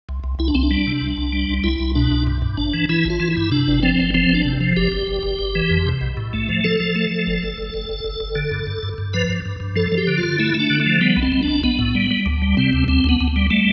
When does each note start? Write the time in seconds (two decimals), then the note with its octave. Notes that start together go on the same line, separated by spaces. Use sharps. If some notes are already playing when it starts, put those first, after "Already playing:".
0.09 C2
0.24 C2
0.39 C2 E4
0.48 D4
0.55 C2 C4
0.63 D4
0.71 G3
0.87 C3
1.01 C2
1.18 C2
1.32 G3
1.49 C2
1.64 C2 E4
1.80 C2
1.95 B2 D4
2.11 C2
2.27 G2
2.42 G2
2.57 A1 D4
2.74 E3
2.89 E3 E4
3.05 A1
3.10 F4
3.20 E3
3.31 E4
3.37 G2
3.51 C3 D4
3.68 G1
3.83 F3 C4
3.99 G1
4.14 F3 C4
4.29 G1 D4
4.45 C3
4.60 F3
4.77 G1 G4
4.92 G1
5.07 G1
5.23 G1
5.39 G1
5.55 E3
5.70 F2
5.86 C3
6.01 B1
6.17 A2
6.33 A3
6.49 F3
6.64 F3 A4
6.80 F3
6.95 A3
7.11 F3
7.27 G1
7.43 G1
7.58 G1
7.74 G1
7.89 G1
8.04 G1
8.20 G1
8.36 D3
8.51 G2
8.67 G2
8.83 G2
8.98 G2
9.13 F3 B4
9.29 G2
9.46 G2
9.60 G2
9.76 F3 A4
9.92 F3
9.98 G4
10.07 D3
10.18 F4
10.23 D3
10.39 A3 E4
10.55 A3
10.60 D4
10.70 D3
10.80 A3
10.86 F3
11.01 G3 B3
11.17 B1
11.22 C4
11.32 B1
11.43 D4
11.48 B1
11.63 B1 B3
11.79 A2
11.95 G3
12.11 G3
12.26 D2
12.42 G3
12.57 C3 C4
12.73 D2
12.88 D2 C4
13.04 D2 B3
13.20 D2
13.36 G3
13.50 G3 A3